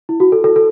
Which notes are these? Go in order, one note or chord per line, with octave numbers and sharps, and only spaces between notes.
E4
F#4
A4
A4
A4